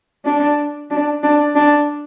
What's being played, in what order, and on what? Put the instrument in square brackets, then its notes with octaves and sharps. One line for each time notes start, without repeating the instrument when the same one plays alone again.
[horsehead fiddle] D4
D4
D4
D4